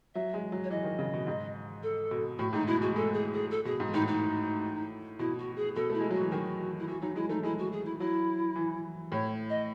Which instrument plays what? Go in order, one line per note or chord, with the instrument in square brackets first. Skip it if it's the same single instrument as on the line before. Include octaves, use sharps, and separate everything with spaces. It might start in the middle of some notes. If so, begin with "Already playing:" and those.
[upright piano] F#3 [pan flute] E5
[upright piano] G#3
F#3
[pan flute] C#5
[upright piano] E3 [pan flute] D#5
[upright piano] D#3
C#3
B2
G#2
[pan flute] A4
[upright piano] B2
[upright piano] A2 [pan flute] F#4
[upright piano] G#2 [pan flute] D#4
[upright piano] B2 [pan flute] E4
[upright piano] G#3 [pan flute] F#4
[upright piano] G#3 [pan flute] A4
[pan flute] G#4
G#4
A4
[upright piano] B2 [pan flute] G#4
[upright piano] G#2
[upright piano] A2 [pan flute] D#4
[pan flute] D#4
[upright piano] B2 [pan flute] E4
[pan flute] F#4
G#4
[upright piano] B2 [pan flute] A4
[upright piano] A3 [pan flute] E4
[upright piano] G#3
[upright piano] F#3 [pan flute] F#4
[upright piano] E3
[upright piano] D#3 [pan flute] F#4
[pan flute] E4
[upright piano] E3 [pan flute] F#4
[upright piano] F#3 [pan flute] D#4
[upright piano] G#3 [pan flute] E4
[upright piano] A3 [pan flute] D#4
[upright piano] G#3 [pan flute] E4
[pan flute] F#4
G#4
E4
[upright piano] F#3 [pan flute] E4
[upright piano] E3
[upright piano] A2 [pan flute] C#5
[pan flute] D#5